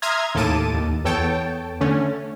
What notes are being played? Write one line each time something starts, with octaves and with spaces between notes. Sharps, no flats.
E5 A#5 C6 D#6 F6 G#6
D#2 A2 A4 A5 D6 D#7
D#2
E2 B3 A4 C#5 G5 A5
D3 A3 C#4